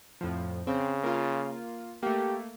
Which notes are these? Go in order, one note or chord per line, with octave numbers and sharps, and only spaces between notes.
F2 A2 F3
C#3 C4
A#3 F4
A3 A#3 G4